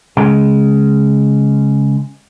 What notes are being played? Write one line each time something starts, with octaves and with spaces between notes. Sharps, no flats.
C#3 G#3